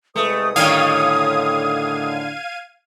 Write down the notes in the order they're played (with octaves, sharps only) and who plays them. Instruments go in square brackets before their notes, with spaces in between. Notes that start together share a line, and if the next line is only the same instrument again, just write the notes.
[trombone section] C2 G#3 B4 [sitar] A3 [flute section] D#6
[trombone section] A2 D3 [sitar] D#3 G3 C#4 [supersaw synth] F5 G#6 D#7